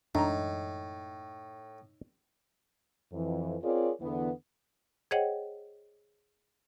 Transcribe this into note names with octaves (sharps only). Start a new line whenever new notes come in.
F#2 A2 E3 G#3 D4 D#4 A#5
F2 E3
C4 F4 G#4 A#4 C#5 D5
E2 D3 E3 B3
G#4 C5 C#5 D#5 F#5 G5